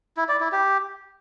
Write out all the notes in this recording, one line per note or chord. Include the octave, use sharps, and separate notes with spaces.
E4
D5
E4
G4